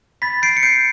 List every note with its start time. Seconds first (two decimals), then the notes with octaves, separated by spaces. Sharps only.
0.22 B5 A6 B6
0.42 G6 C7 D7
0.57 C#7
0.63 G6 C7 D7